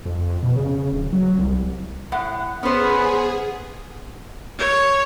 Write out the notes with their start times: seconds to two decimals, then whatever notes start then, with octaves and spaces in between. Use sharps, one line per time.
0.06 F2
0.43 B2
0.56 C#3
0.92 D1
1.13 F#3
1.39 C2
2.12 A2 F#5
2.63 B3 C#4 G#4 C5
4.58 C#5